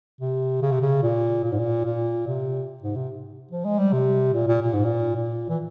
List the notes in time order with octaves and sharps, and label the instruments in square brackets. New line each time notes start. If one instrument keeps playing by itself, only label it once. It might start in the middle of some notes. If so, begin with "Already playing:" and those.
[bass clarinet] C3
C#3
C3
C#3
A#2
A#2
G#2
A#2
A#2
C3
G#2
C3
F3
G#3
G3
C3
A#2
A#2
A#2
G#2
A#2
A#2
E3